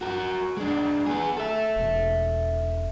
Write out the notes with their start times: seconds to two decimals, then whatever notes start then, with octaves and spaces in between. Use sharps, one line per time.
0.01 F#4 A#4
0.57 G#3 D4
1.07 B3 G#4
1.37 A4 E5
1.76 E1